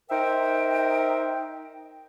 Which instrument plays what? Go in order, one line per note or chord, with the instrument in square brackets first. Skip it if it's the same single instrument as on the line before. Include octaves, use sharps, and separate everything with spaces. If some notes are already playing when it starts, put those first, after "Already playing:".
[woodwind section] D#4 A#4 C5 E5 G5